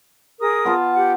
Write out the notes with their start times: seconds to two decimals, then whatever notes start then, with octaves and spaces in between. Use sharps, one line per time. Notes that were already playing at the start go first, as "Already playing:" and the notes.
0.41 G#4 A#4 D#6
0.65 B3 F4 A5
0.94 G4 F#5